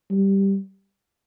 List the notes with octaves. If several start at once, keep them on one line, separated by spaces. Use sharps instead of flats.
G3